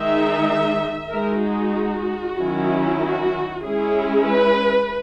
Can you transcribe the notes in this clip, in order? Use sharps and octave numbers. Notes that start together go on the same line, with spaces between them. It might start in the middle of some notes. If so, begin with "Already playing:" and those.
Already playing: D#3 G#3 D#4 E5
G#3 D#4 A#4
F#4
D#3 F#3 C#4 E4
F#4
G#3 C#4 E4 G#4
B4